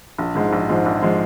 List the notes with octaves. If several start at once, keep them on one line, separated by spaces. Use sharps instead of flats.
A#1
G#2 F3 G#3
A#1
G#2 F3 G#3
A#1
F3 G#3